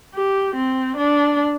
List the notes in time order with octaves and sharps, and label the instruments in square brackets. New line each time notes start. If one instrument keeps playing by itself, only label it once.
[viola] G4
C4
D4